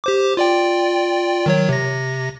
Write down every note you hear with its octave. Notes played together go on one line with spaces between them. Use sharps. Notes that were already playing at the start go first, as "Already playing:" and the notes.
G4 C5 D6
F4 D5 G5
D#3 F#3 C#5
C3 A#6